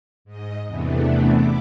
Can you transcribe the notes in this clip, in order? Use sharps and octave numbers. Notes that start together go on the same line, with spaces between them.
G#2 D#5
E2 C3 E3 A3 B3 D4
E4 D6